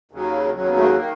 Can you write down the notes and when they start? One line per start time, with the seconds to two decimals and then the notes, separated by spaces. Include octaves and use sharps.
0.11 D#2 C#3 F#3
0.54 D#2 C#3 F#3
0.68 B3
0.76 A3
0.82 A#3
0.97 D#3 A#3